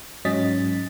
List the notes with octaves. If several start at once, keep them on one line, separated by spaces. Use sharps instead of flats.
G#2 F#3 C#4 D#5 A6 B6